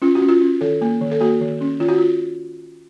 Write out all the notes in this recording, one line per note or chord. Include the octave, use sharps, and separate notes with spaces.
C#4 F4
F#4
C#4
F4
C#4
D#3 A4
A#3
D#3
A4
A#3 F#4
D#3
C#4
D#3 F4
F#4
F4